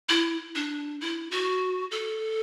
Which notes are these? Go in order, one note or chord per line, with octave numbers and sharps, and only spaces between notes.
E4
D4
E4
F#4
A4